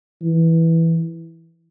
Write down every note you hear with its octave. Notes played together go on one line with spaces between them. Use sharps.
E3